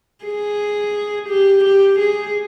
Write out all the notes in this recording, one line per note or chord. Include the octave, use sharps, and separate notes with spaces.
G#4
G4
G4
G#4